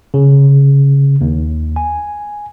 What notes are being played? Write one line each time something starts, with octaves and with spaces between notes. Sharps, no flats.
C#3
D#2
G#5